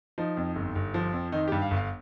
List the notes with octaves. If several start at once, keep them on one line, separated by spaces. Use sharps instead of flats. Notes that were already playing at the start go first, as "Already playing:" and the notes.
F3 D#4
F2
G1
G1
F3
F2
D#3 D#4
G2 G4
F5
G1
F5